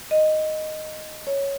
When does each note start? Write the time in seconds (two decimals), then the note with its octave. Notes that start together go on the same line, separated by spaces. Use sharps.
0.11 D#5
1.27 C#5